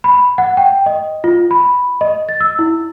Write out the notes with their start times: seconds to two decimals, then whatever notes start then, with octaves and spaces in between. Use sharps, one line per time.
0.04 B5
0.38 F#5
0.57 G5
0.86 D#5
1.24 F4
1.51 B5
2.01 D#5
2.29 A6
2.40 E6
2.59 E4